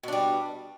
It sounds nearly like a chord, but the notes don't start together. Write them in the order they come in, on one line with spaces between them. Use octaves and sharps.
B2 D4 G3